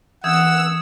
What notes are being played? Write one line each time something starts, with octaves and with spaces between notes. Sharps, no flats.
E3 F#5 D#6 E6 G#6 E7